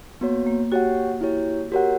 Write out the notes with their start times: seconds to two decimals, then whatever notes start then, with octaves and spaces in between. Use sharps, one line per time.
0.21 A#3 B3 F#4 C#5
0.47 A#3
0.72 F#4 G4 C#5 F#5
1.21 E4 G4 C#5
1.72 F#4 G4 A#4 C#5 F#5